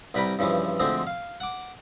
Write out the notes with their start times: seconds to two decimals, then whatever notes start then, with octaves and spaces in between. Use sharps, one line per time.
0.14 C2 G3 B4 G5 A#5 B5
0.39 G2 C#3 E3 F3
0.80 D2 D3 F3 G#3 C4
1.07 F5
1.40 F#5 D6